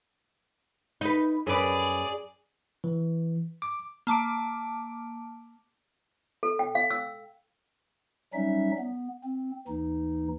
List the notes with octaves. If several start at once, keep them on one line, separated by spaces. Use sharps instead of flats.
D#4 B4
F#2 G#4 B4 D5
E3
D6
A#3 A5 D6 D7
A4
G5
F5
E6
F#3 G3 C#4 D#4 E5
B3
C4
D#2 E3 D#4